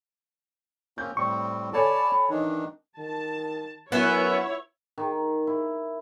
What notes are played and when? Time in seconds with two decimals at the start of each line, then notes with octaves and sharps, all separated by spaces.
0.98 A#3 C4 C#4 G6
1.17 A2 G3 C4 C#6
1.73 A4 C#5 D5 G#5 A5 B5
2.30 D#3 E3 D4 D#4
2.99 D#3 A5
3.92 F#2 B3 C#4 E4 C#5 E5 F#5
4.98 D#3
5.47 E4